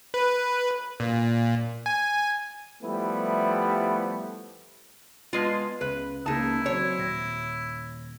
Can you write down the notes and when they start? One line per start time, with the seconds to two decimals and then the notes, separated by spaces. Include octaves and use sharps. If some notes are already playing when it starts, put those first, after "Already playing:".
0.14 B4
1.00 A#2
1.86 G#5
2.83 F3 G3 A3 B3 E4
5.33 G#3 B3 F4 A5
5.81 C#2 B4
6.26 C#2 C#3 A#3 D#4 E4 A5
6.66 F#3 C4 C#5
6.98 D#1 A#6